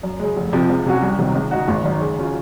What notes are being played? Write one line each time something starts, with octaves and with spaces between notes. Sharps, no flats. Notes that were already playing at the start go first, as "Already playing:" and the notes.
F#2
C#3 G#3
F1
F2 C3 F3 C4
C#2
C3 F#3 C#4 F#4
C2
C3 D#3 F#3
C#2
C#3 G#3 D#4 F#4
G#1
F#2 D#3
C#3
F#3 C#4 F4